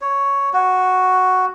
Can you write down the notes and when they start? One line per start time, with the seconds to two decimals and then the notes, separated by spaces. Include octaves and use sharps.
0.01 C#5
0.53 F#4